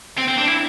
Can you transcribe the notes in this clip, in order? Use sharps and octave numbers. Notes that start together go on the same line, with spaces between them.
C4
C4
D4
E4